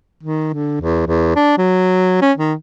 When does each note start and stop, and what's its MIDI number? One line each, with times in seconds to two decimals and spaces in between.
0.23 0.52 51
0.53 0.77 50
0.81 1.03 40
1.06 1.33 40
1.36 1.56 62
1.58 2.18 54
2.21 2.32 61
2.37 2.54 51